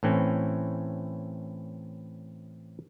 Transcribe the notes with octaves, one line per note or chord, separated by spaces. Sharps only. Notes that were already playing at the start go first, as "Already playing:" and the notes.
A2 E3 C4 C#4